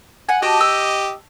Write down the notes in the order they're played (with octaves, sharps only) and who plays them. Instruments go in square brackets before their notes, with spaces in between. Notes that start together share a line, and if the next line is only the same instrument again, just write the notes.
[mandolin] F#5 G#5
[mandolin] F#4 A5 D6 [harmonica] G4 D#5
[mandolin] E6